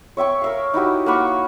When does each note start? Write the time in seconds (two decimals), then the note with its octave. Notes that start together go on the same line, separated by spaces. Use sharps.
0.17 C#5 E5 G5 C#6
0.42 A#4 E5 F5
0.74 D#4 E4 F#4 G4
1.06 A#3 F#5 B5 C#6